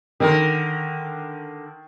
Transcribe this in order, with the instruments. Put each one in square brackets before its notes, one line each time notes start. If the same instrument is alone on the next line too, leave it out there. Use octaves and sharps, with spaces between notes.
[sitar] D3 A#4 [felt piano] D#3